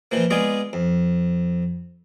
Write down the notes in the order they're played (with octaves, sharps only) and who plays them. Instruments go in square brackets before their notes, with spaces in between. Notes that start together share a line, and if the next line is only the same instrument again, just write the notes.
[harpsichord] A#2 E3 F3 A#3
G#3 B3 F4 G#4 D5
F2